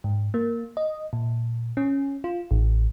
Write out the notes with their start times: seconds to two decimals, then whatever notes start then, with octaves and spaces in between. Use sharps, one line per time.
0.04 G#2
0.34 A#3
0.77 D#5
1.13 A#2
1.77 C#4
2.24 F4
2.51 A1